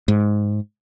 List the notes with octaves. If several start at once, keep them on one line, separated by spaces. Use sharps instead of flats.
G#2